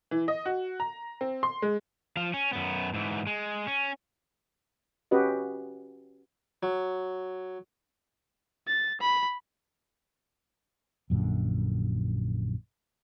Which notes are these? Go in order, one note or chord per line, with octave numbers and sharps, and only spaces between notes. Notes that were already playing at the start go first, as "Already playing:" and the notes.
E3
D#5
F#4
A#5
C4
C6
G#3
F3 F5
C#4
F#2 B3
G#2 E3
G#3
C#4
C#4 F#4 G4 B4 D#5
F#3
A6
B5
A#1 F#2 A#2 D3